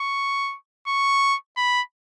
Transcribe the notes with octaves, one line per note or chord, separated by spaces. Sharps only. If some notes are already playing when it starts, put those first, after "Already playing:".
Already playing: C#6
C#6
B5